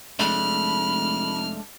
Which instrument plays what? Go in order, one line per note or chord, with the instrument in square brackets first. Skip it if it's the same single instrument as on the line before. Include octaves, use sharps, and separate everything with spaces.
[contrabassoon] F1 [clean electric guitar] G#3 A3 D4 [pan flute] B5 [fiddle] F6